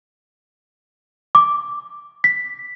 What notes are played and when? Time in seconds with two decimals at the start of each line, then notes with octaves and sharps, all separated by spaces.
1.35 D6
2.24 B6